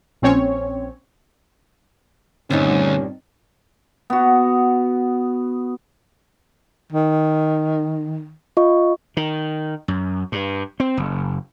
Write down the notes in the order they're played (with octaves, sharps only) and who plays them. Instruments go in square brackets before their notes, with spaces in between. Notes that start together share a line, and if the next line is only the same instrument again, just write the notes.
[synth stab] A#1 C4 C#4 C#5
[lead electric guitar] D2 [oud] G2 A#2 D#3 [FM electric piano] C4 D#4 [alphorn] C#4
[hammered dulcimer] B3 F#4
[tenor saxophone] D#3
[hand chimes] F4 D#5 C#6
[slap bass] D#3
F#2
G2
C4
F#1